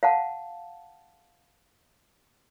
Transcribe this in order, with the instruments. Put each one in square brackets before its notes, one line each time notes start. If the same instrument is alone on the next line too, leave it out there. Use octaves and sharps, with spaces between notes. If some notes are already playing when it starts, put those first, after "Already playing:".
[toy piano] F5 F#5 A5